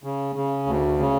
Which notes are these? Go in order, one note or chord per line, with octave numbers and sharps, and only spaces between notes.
C#3
C#3
D2
C#3